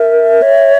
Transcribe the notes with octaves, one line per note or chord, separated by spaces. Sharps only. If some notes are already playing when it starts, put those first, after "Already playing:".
Already playing: A#4 E5
C#5